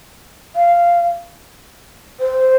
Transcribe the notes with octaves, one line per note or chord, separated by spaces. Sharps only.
F5
C5